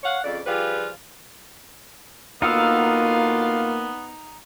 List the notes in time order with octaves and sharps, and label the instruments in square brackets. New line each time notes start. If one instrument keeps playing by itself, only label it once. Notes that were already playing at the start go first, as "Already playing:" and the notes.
[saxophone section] C#5 F5 F#5
F2 C#3 D5
F3 G3 F4 G4 G#4 B4
[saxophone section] D2 F4 F5 [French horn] A#3 [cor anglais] B3 [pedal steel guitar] D#4 F#5 E6